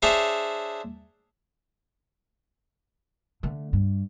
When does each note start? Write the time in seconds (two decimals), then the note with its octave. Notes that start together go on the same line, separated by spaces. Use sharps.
0.02 D4 G#4 C5 C#5 E5
3.43 D3 A3
3.73 G2